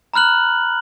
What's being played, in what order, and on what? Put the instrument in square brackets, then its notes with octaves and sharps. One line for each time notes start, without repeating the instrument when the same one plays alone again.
[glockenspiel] A#5 B5 F6 F#6 F#7